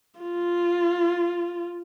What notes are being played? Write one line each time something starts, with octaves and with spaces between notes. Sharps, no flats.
F4